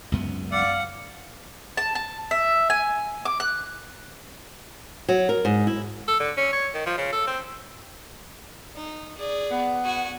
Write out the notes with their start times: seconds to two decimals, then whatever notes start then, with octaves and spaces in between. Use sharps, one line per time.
0.12 C#2 F#2 B3
0.52 D5 F5 F#5
1.77 A5
1.95 A5
2.31 E5
2.70 G#5
3.25 D6
3.40 F#6
5.09 F#3
5.29 A#4
5.45 G#2
5.67 E4
6.08 A4
6.20 D3
6.37 C#4
6.53 C#5
6.74 D#3
6.86 F3
6.97 C#3
7.12 A4
7.27 C4
8.75 D#4
9.18 G#4 D5
9.51 B3
9.85 F#4 G#5